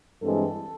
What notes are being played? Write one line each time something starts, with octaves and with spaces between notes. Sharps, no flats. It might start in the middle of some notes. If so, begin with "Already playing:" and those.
G2 E3 G#3 C4 A4